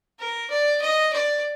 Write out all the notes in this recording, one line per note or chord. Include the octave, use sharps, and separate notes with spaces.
A#4
D5
D#5
D5